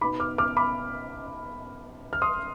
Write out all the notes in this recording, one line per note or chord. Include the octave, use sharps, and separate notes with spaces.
B2 B3 D#4 B5 D6
D6 F6
D6 F6
B5 D6
F6
C6 D#6